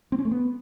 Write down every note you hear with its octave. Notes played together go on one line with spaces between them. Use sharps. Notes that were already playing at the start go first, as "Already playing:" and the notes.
C4
C#4
A3
B3